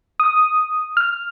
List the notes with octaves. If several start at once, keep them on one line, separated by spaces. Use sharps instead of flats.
D#6
F6